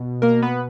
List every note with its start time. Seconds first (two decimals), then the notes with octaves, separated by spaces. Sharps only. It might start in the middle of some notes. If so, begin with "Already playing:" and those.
Already playing: B2
0.22 A#3 A#4
0.42 B3 B4